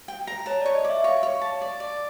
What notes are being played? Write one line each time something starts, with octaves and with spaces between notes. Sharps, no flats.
G5
A#5
C#5 A5
C#5 D5
D#5
D6
E5
C#5 F5
C#5
A5
D5
D5